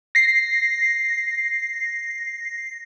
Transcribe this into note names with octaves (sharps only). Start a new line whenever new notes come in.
A#6 C7